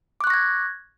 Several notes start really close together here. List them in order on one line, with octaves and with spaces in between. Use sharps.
D6 F#6 C#6 A#6 G#6